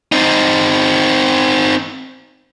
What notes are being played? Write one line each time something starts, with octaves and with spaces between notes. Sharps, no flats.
C4 D#4